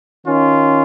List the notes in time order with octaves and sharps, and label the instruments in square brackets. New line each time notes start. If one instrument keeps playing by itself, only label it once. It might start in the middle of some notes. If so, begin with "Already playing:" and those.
[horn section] D#3 C#4 F4